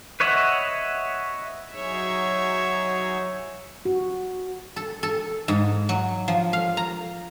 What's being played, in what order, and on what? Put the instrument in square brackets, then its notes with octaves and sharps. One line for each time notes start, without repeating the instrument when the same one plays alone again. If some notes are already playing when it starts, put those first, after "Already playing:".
[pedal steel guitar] B4 C#5 D#5 E5 F#5
[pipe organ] F#3 D#4 G#4 [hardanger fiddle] C#5 E5
[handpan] F#4
[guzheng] A4
A4
G#2
F#3
F3
F5
A#5